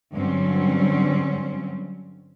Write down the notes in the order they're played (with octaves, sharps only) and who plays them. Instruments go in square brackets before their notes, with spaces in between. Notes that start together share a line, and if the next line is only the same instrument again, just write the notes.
[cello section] G2 D3 F#3 G3 C4 C#4